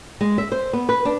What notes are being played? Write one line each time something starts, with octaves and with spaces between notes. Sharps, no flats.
G#3
E5
C5
B3
B4
D4